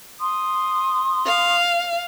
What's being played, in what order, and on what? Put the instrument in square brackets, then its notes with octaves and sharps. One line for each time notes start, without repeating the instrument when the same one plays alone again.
[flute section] C6 D#6
[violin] F5